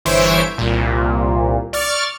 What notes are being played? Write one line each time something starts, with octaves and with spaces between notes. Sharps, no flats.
G1 E3 C5 C#5 E5 D7
C2 A#2
D5 C#6 F6 A6